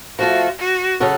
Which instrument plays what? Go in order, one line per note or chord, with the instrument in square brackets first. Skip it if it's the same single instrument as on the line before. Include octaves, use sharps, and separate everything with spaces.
[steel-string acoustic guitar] F3 A3 F4 [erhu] F#4
[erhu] F#4
[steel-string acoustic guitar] C#3 F#3 C#4 F#4 A4